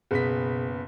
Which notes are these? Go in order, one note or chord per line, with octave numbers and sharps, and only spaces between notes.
F#1 B2 B3 G#4 B6